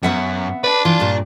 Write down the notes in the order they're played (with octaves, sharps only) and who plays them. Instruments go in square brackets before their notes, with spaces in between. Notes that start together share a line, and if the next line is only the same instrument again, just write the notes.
[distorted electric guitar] F#2 [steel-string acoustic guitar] B3 E5 F#5
[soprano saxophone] B4 [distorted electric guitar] D5 A5
[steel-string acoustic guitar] E3 [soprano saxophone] F4
[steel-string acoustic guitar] G2 A#2